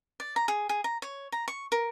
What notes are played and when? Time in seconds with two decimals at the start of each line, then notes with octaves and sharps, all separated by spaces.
0.20 D5
0.36 A#5
0.48 G#4
0.69 G#4
0.84 A#5
1.02 C#5
1.32 A#5
1.48 C#6
1.72 A#4